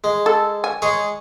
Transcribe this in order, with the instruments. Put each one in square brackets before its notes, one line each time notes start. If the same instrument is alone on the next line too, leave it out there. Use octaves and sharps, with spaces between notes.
[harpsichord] G#3
[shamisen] A4
G#5
[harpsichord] G#3 G#4 C#5